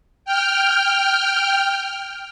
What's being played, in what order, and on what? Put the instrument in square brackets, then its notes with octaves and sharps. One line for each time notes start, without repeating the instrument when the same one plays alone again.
[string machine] G5 F6